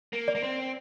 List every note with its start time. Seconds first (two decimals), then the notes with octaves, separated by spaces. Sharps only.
0.13 A#3
0.28 D5
0.35 A#3
0.43 C4